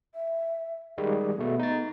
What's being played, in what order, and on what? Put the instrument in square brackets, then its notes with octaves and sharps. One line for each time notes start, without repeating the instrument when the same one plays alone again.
[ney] E5
[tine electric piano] D#3 G3 G#3 [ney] G#4
[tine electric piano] B2 A3 [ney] B3
[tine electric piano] D#4 A6